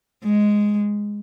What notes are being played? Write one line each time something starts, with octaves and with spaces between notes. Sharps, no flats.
G#3